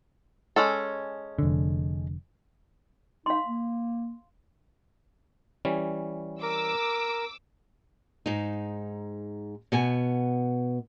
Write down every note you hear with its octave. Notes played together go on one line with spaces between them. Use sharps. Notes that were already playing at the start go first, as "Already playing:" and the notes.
G#3 C#4 A4
F1 D3
D#4 F5 C6
A#3
E3 G3 C#4
A#4 D6 E6
G#2 D#4
B2 B3 G#5